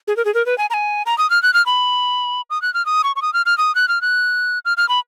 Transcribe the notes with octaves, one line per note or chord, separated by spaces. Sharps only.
G#4
A#4
G#4
A#4
B4
G#5
A#5
G#5
A#5
D#6
F6
F#6
F6
B5
D#6
F#6
F6
D#6
C#6
C#6
D#6
F6
F6
D#6
F#6
F6
F#6
F6
F6
B5